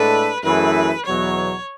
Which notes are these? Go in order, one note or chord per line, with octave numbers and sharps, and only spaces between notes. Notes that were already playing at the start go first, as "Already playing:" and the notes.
Already playing: A2 G#3 D4 A4 B4
F#2 E3 A3 E4 G#4 B4
E2 B2 F#3 C#5